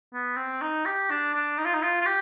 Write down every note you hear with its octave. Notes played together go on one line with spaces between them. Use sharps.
B3
C4
D#4
G4
D4
D4
D#4
F4
D#4
F4
F4
G4